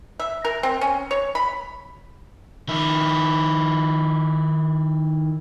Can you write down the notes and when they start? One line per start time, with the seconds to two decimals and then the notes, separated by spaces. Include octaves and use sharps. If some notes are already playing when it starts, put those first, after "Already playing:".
0.20 E5
0.45 A#4
0.63 C4
0.81 C#4
1.11 C#5
1.35 B5
2.68 D#3 E4